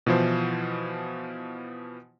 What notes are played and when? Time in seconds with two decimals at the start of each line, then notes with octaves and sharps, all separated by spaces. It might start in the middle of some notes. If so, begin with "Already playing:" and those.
0.06 B2 E3 F3 E4 C5